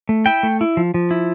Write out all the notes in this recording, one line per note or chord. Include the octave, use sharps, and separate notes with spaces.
A3
E4 G5
A3
E4
F3
F3
E4